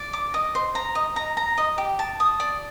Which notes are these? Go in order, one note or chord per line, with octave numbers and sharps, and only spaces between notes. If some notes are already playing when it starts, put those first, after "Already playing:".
Already playing: D5
D6
D#5
C5
A#5
D#5
A#5
A#5
D#5
G4
A5
D#6
D5